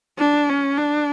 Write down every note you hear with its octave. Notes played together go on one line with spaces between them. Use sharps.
D4
C#4
D4